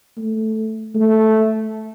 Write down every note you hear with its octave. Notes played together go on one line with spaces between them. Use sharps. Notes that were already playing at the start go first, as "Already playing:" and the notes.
A3
A3